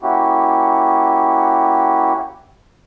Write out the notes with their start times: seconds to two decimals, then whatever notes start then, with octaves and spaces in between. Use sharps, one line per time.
0.02 A#3 C#4 E4 F#4 G4